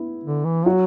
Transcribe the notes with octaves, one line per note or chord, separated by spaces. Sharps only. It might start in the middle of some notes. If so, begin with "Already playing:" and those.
Already playing: B3 E4
D3
E3
F#3 F#4